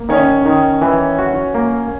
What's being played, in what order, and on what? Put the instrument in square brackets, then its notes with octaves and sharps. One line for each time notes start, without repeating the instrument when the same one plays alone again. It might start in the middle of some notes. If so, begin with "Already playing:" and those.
Already playing: [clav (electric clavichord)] A#3
[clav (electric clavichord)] D#3 [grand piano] C#4 C#5
[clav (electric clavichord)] D#3
E3
F#4
A#3